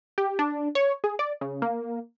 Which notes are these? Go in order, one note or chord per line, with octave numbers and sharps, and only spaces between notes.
G4
D4
C#5
G#4
D5
C#3
A#3